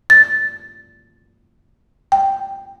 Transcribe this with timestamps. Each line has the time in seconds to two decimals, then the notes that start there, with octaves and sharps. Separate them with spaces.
0.10 A6
2.12 G5